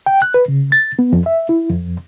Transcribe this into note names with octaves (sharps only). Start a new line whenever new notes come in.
G5
F#6
B4
C#3
A6
B3
F2
E5
E4
F2